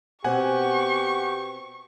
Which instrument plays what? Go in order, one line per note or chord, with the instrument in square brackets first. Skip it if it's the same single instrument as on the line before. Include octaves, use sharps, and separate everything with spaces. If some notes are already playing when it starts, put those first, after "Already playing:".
[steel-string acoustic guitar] B2 C4 [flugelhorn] G4 [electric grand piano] F#5 G#5 [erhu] C#6